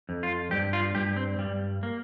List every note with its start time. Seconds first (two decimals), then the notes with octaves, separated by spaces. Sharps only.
0.09 F2
0.23 F4
0.51 G2 G4
0.73 F4
0.95 G2 G4
1.16 C4
1.39 G2 G3
1.83 A#3